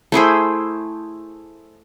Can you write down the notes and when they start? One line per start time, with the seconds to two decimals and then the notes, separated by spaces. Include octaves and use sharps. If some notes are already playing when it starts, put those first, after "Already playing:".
0.12 A3 E4 G#4 C5